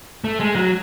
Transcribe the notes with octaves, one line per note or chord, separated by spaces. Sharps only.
A3
G#3
F#3